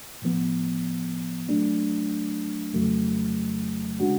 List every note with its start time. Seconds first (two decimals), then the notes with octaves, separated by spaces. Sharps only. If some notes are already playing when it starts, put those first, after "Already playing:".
0.22 A2 F3 B3
1.48 F#3 A3 D4
2.73 F2 C#3 F#3 A3
4.00 C#3 G#3 D4 F#4